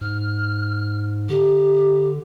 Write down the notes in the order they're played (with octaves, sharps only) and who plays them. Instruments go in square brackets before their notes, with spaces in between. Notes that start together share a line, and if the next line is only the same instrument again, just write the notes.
[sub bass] G#2 [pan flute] F6
[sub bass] D3 [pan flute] G4